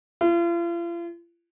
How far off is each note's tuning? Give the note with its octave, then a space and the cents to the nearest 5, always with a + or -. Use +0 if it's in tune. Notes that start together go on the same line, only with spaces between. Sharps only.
F4 -40